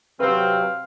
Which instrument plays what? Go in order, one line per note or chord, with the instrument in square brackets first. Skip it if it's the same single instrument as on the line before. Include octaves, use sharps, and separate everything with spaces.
[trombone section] C3 F#3 C4 [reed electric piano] B4 [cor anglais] F5